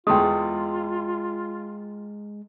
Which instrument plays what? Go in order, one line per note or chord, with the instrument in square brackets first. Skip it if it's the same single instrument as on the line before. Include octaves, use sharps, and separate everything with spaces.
[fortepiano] E2 A3 [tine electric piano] G#3 [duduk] F4 [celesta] G5 C6 D#6